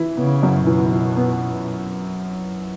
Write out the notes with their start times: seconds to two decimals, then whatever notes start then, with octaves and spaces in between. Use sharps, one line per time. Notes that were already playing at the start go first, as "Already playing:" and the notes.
Already playing: E3 E4
0.17 C#3 B3
0.43 F#2
0.67 B2 E3
0.92 E4
1.17 B3